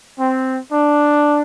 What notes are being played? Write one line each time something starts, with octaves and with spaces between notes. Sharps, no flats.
C4
D4